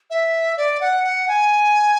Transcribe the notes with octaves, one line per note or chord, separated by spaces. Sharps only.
E5
D5
F#5
F#5
G#5